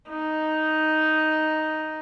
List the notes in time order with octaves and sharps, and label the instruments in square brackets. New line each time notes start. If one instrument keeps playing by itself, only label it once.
[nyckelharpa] D#4